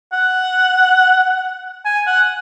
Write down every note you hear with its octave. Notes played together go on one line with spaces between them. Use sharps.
F#5
G#5
F#5